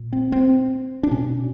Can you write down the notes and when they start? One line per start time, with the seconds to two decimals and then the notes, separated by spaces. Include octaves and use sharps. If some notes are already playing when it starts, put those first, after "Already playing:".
Already playing: A#2
0.13 C4
0.32 C4
1.03 D4
1.11 B2 C#4